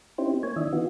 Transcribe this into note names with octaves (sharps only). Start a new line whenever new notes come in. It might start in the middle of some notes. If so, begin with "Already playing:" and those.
C4 C#4 D#4 E4 G4 C5
A#3 C#5 G#5
D#3 E3 D4 D#5 E5
E3 B3 D#4 F4 F#4